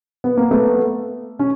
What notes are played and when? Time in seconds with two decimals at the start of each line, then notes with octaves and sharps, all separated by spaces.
0.24 B3
0.37 A#3
0.51 A3 B3
1.39 C#4